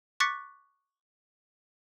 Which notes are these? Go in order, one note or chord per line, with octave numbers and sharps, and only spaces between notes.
C#6 D6 F#6 A6 B6 C#7